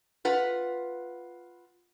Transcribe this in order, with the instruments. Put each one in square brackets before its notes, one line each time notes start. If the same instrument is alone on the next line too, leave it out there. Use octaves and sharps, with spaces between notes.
[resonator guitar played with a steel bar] F4 B4 F#5